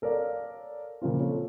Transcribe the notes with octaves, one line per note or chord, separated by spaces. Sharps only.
A4 A#4 C#5 D5 F5
A#2 C#3 F3 A#3 C4 F4
A4 C#5